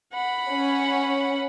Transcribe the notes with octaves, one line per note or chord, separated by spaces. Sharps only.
F#5 B5
C#4